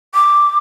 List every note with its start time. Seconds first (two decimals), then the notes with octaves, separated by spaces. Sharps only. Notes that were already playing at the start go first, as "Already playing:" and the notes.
0.14 D6